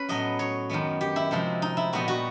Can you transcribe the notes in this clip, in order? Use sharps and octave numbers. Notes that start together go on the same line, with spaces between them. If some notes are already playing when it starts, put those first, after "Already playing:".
Already playing: C#4 B4
A2 F#3 B3 D#5
C#5
F#2 D#3 G#3 B3
G4
E4
C3 F3 G#3 C4 D#4
D#4
E4
A#2 G3 B3 D#4 F#4
F#4